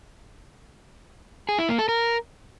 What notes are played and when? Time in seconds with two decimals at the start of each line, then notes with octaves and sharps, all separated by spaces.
1.49 G#4
1.59 E4
1.69 A#3
1.79 A4
1.89 A#4